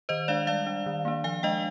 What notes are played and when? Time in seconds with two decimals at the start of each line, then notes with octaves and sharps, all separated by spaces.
0.09 D#3 C5 D#5
0.28 G#3 D4 D5 F5
0.47 G3 D5 F5
0.67 D4
0.86 D#3
1.05 A#3 D4
1.24 F3 F5 G#5
1.43 G#3 D4 D#5 G5